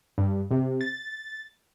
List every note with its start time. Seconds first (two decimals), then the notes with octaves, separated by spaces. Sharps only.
0.18 G2
0.51 C3
0.81 A6